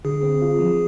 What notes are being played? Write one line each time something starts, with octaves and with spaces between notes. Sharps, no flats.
D3 G#4
C4
F4
F3